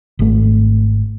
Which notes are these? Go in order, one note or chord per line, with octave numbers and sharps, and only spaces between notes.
G#1 A3